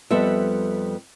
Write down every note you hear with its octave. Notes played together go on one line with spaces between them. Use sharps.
F2 G3 B3 A4 C5 E5